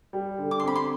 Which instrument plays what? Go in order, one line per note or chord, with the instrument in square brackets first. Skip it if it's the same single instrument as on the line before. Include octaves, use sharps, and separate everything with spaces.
[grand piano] G3
D3
[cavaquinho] D6
C6
[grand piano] C4 [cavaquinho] B5
[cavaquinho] C6